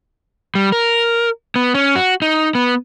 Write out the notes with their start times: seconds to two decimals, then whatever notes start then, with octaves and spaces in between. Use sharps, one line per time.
0.55 G3
0.72 A#4
1.56 B3
1.74 C#4
1.96 F#4
2.22 D#4
2.55 B3